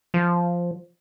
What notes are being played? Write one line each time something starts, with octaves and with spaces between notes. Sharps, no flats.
F3